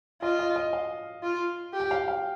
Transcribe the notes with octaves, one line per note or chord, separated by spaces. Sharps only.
F4 D#5
D#5
D#5
F5
F4
G4
G5
F5
F5